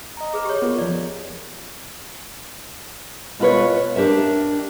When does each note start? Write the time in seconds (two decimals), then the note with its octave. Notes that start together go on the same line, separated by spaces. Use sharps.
0.17 D#5 A#5
0.34 G#4 B4
0.45 G4 C#5
0.62 B3 F4 A#4
0.78 F2 F3 D5
3.39 B2 F4 B4 C#5
3.96 D4 G4 A#4 E5